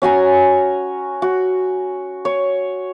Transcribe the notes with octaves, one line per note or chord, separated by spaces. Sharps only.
C#4 F#4 G#5 A#5
F#4
C#5